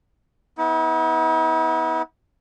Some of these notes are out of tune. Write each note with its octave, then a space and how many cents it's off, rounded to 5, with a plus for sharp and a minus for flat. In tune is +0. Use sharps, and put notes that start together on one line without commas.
B3 +0 E4 -45